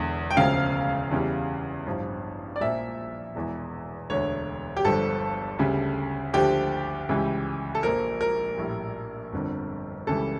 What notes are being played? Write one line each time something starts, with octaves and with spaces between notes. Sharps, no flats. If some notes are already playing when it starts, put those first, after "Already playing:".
Already playing: E1 E2 D3
G5
E1 D2 C#3 F3 F5
E2 C#3 E3 G3
A1 G2 F3
D5
A#1 A#2 F3 E5
E1 E2 E3
E1 D2 D3 C#5
G4
G1 G2 D3 F3 A4
D2 C#3 G3
D2 D3 F3 G4
C#2 C#3 E3 G3
A4
A#1 A#2 F3 A#4
A#4
A#1 A2 G3
G1 F2 D3
C#2 C#3 E3 G3 A4